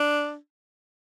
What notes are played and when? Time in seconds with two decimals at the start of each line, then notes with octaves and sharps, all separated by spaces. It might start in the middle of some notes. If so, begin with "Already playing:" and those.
Already playing: D4